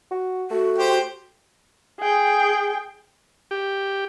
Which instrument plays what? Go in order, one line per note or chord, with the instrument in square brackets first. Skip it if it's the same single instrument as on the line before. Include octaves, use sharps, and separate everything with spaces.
[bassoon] F#4
[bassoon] A3 [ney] F#4
[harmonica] G4 C5 G5
[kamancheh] G#4 G5
[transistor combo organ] G4